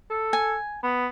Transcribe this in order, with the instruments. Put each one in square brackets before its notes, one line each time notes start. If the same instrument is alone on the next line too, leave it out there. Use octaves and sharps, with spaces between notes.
[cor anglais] A4
[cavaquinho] G#5
[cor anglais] B3